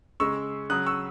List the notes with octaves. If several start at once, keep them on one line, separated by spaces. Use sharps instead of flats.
C#3 G#3 C#6 E6
C#3 F#3 D#6 F#6
C#6 E6